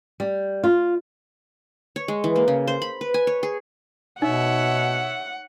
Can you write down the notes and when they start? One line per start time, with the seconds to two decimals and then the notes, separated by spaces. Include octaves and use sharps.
0.20 G3
0.64 F4
1.96 C#5
2.08 G#3
2.24 E3
2.36 A#3
2.48 C#3
2.67 C5
2.82 B5
3.01 B4
3.14 G#5
3.27 C#5
3.43 G#4
4.22 B2 D#4 C#5 E5 F#5